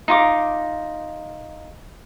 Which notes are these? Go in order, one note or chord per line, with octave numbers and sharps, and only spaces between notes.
D#4 F4 D6